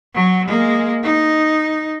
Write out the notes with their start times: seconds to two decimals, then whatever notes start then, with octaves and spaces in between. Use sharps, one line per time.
0.14 F#3
0.48 G#3 A#3
1.03 D#4